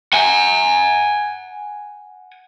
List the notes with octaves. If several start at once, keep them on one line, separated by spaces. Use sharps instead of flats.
F#5 G#5